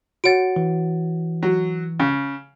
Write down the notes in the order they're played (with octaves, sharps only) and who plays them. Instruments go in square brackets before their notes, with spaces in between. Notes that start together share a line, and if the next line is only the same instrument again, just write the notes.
[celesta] F#4 C#5 A6 [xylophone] F#5 D7
[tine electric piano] E3
[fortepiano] F#3
C#3